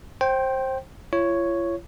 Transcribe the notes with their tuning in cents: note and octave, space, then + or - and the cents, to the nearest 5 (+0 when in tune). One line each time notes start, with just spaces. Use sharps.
C5 +20 G5 -10
F4 -45 C#5 +0